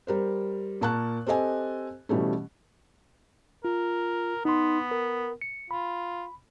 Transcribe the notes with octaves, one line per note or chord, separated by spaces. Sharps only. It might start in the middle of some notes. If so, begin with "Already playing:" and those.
G3 A#4 C5
A#2 A#4 A5 C#6 F#6
C4 G4 A4 D#5 G#5
B2 E3 G3 A3 C#4
F4 A#4
B3 D#4 C6
A#4
C#7
F4 B5